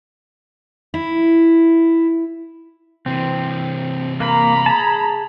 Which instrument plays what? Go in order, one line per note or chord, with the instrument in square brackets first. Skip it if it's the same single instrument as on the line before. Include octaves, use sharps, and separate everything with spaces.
[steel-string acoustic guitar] E4
[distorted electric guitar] C3 E3 [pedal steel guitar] C4
[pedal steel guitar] A#3 [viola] A#5 B5
[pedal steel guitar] G#4 A5